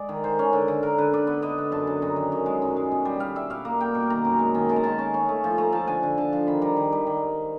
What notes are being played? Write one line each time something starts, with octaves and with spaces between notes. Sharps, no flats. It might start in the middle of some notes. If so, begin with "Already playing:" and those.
Already playing: G#3 D5
D#3
D#3 C5
C#4
D3
D3
D3 A#4
D3 B4
D3 D5
B3
D3 D#5
B3
F#2 A5
F#2
F#2 A#5
D#3
F#2
G#3
F#2
G#3
B2
G3
G3 F5
G3 E5
B2 F5
A#3
A#3 G5
B2
D#3 A#5
F#2
G#3
D#3
G#3 A5
A#5
D#3 A5
C#4 A5
C#4
A3
F3
A3 A#5
F3 A5
D3 G#5
D3
D3 A5
F3
D#3 B5
G3 A#5
D#3
G3
D#3